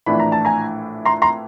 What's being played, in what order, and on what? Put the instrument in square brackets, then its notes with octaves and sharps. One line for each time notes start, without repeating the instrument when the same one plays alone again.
[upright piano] A#1 A2 E3 A3 D4 B5
A#5
A5
G#5 A#5
A#5 C6
A#5 C6